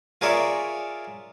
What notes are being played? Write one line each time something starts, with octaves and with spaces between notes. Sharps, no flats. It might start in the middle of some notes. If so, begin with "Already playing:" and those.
F4 G#4 A#4 C#5 D5 E5